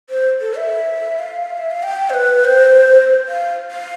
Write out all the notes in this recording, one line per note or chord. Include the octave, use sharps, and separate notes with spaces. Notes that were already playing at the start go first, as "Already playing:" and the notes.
C5
A4
E5
F5
E5
F5
G5
C5
B4
C5
F5
F5